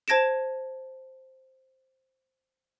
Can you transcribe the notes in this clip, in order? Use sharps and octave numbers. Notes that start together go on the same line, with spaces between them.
C5 A5 G#6 A#6 D7 E7